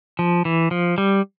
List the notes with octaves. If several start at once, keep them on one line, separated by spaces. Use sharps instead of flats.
F3
E3
F3
G3